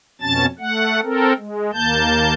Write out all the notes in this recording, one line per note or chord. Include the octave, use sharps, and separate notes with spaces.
F2 B2 C#4 A5 A6
A3 F#5
C4 A4 A#4
G#3
D#2 A#3 A5 G6